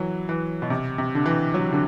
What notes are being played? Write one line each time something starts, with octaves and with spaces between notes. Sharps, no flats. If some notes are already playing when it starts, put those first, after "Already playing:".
Already playing: E3 F#3
E3
B2
C3
C3
D3
E3
F#3
D3